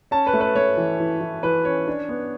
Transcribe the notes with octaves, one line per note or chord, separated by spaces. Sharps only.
C#4 A5
B4
A3
B4
A3 C#5
E3
E3
E3
E3 B4
C#4 C#5
D4
B3